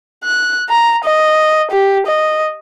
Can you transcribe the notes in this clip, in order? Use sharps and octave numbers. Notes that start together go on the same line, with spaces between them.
F#6
A#5
D#5
G4
D#5